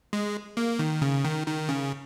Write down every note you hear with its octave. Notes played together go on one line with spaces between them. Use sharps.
G#3
A#3
D#3
C#3
D#3
D#3
C#3